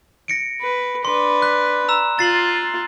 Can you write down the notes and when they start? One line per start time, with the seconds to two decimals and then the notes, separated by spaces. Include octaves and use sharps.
0.28 A#6 C#7 D7
0.62 B4
1.05 D4 B4 C6
1.42 F#6
1.88 A#5 E6 E7
2.19 F4 A6 C7 F#7